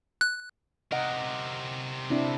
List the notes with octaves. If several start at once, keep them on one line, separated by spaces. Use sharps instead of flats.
F#6
C3 A#4 D#5 F#5
C4 D4 E4